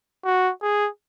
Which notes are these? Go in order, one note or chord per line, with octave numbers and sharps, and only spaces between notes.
F#4
G#4